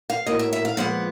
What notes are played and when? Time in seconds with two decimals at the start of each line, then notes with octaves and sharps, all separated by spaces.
0.10 F5
0.26 A2 F#3 A#3 D#5
0.39 E5
0.53 E5
0.65 F5
0.77 A#2 F3 G#3 B3 F#5